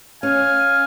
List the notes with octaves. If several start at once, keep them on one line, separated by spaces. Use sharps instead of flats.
C#4 F5 G#5